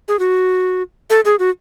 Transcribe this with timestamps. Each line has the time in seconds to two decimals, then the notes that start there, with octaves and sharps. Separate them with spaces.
0.08 G#4
0.19 F#4
1.10 A4
1.25 G#4
1.39 F#4